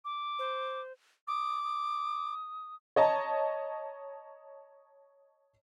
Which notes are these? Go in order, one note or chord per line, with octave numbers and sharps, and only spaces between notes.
D6
C5
D6 D#6
D#6
C#5 D#5 A5 A#5